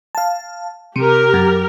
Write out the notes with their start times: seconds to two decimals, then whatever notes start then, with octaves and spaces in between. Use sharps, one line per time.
0.15 F5 A5
0.96 C3 G4 A#4
1.34 F#2